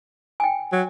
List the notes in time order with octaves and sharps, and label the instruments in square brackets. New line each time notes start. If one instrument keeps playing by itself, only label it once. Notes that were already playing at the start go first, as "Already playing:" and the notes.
[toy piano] G5 G#5
[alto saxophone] F#3